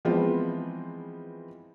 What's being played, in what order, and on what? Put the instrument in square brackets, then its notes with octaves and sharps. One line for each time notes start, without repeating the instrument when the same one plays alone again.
[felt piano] E3 F3 G#3 B3 C4 F4